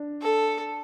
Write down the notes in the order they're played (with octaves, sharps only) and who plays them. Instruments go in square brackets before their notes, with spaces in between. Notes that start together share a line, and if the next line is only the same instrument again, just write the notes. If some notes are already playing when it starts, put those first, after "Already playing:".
Already playing: [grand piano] D4
[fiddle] A4